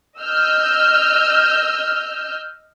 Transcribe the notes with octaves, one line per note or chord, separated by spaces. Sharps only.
D#5 E6 F6 G6